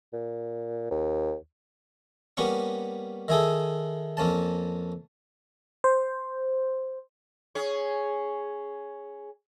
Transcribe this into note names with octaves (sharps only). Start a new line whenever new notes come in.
A#2
D#2
G3 A#3 B3 C#4 C#6
D#3 E4 G#4 A4
F2 A#3 C#4 A5
C5
C#4 G#4